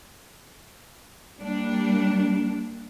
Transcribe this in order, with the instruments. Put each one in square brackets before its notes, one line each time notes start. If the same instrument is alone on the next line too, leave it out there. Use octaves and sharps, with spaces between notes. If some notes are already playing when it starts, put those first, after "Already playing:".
[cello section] G3 A#3 D4